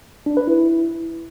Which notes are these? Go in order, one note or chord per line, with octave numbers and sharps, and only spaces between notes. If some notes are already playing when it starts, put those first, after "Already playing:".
D4
B4
E4